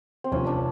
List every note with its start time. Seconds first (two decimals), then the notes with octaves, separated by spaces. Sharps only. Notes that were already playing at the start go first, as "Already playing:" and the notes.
0.24 C4
0.32 F1 F2 C3 F3 C#4
0.47 D4